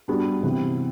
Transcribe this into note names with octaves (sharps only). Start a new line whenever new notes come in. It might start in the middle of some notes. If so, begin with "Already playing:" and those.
G3 B3 D4 F#4
C3 E3 B3